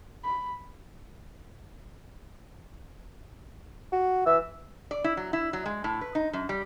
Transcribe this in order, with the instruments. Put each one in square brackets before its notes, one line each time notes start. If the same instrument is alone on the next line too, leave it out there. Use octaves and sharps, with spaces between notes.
[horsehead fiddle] B5
[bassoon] F#4
[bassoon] E3 [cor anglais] E5
[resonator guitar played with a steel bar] D5
E4
F#3
E4
F#3
G#3
A2
B4
D#4
F#2
G3